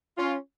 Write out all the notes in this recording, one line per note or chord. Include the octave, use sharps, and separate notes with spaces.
C#4 F4